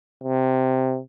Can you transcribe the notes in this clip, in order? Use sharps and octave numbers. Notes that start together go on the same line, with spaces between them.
C3